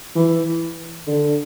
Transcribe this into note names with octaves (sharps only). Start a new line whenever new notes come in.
E3
D3